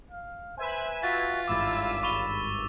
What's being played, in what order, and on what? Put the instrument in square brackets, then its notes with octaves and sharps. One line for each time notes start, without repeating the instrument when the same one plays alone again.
[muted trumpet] F5
[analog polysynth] B4 E5 G#5 [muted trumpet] C5
[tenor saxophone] F4 [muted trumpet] F#4 [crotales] A6 B6
[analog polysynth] G#1 G2 E6 [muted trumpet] E4 [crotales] D6 A6
[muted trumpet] B5 [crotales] C#6 F7 G7